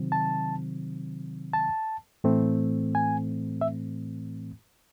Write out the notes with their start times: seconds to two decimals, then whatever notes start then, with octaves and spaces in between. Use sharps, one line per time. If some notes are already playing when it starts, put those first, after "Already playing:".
Already playing: C3 D#3 F#3 C4
0.12 A5
1.54 A5
2.24 A2 E3 A3 C4
2.95 G#5
3.61 E5